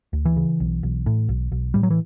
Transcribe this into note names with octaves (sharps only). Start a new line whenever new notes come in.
D2
E3
C#3
B1
B1
A2
B1
B1
A2 G3
F#3
E3